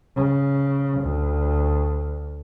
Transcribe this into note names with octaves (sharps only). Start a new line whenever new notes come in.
C#3
D2